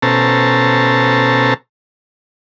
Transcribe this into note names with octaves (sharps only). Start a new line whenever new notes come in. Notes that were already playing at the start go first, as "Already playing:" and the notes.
B2 C#4 A4 C5 A5 A#5